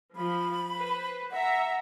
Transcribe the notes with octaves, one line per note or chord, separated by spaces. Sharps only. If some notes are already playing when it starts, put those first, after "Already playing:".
F3 B5
B4 C5
E5 F#5 A#5